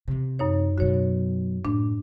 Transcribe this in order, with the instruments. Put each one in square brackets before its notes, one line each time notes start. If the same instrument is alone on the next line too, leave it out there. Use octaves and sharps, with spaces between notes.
[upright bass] C3 E3
[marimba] F#2 D#4 C#5
[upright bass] B2 F#3 [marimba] F#4 C#5
[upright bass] A2 [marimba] D4